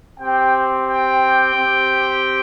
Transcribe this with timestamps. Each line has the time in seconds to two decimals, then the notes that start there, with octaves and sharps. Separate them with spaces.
0.19 C4 G4 G5
0.87 G5
1.55 C4 G4